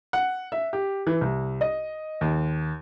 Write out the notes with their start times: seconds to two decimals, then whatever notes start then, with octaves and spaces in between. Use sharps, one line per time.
0.13 F#5
0.52 E5
0.73 G4
1.07 E3
1.21 C2
1.61 D#5
2.21 D#2